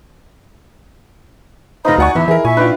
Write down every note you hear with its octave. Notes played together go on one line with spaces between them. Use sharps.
F1 D#4 B4 C5 D#5 F5 B5
D2 F#4 D5 F#5 G#5 C#6
E2 E3 E4 E5
E3 G#4 A#4
A#2 E5 G#5 C#6
D4 D#4 F4 B4 G5